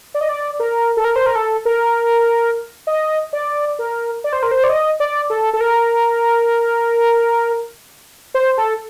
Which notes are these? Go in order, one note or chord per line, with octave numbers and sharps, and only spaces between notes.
D5
D#5
D5
A#4
A4
A#4
C5
A#4
A4
A#4
D#5
D5
A#4
D5
C5
A#4
C5
D5
D#5
D5
A4
A4
A#4
C5
A4